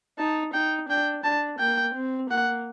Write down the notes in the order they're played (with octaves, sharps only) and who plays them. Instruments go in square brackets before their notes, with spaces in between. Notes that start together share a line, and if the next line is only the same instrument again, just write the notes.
[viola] D#4 [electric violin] A5
[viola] D#4 [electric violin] G5
[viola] D4 [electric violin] G5
[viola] D4 [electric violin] A5
[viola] A#3 [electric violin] G5
[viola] C4
[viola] A#3 [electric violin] F#5